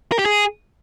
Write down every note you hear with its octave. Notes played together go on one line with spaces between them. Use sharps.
A#4
G4
G#4